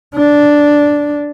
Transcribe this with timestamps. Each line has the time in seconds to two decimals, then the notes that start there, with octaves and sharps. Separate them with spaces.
0.15 D4